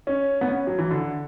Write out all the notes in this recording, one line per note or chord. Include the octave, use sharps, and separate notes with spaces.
C#4
B3
C#4
F#3
E3
D3